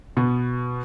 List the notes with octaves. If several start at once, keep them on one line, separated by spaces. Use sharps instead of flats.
B2 B3